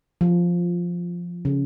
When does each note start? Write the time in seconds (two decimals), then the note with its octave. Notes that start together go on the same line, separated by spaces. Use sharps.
0.21 F3
1.45 C#3